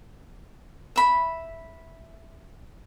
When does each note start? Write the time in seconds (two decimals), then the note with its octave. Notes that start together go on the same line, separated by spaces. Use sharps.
0.96 E5 B5